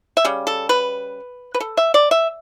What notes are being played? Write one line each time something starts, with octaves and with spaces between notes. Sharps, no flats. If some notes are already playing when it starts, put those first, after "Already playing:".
E5
C#3 G3
A4
B4
B4
A4
E5
D5
E5